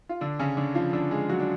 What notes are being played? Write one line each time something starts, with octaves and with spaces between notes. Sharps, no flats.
F4
D3 D4
C#3 C#4
D3 D4
F3 F4
D3 D4
G#3 G#4
F#3 F#4
D4